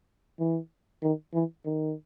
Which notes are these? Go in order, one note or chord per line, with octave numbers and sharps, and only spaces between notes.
E3
D#3
E3
D#3